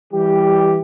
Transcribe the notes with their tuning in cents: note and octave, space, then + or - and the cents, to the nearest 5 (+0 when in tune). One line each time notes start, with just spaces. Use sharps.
E3 +0 G3 +25 G4 +0